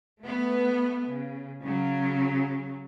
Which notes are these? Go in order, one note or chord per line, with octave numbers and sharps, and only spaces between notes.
A3 B3
C#3
C#3 F#3